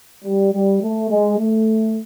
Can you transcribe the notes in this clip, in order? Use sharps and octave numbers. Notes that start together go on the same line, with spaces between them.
G3
G3
A3
G#3
A3